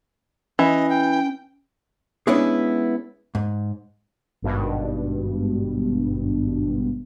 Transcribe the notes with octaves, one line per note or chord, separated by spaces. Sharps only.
E3 C#4 D#5
G5
G#3 B3 C#4 D4 E4 G#4
G#2
G#1 G2 B2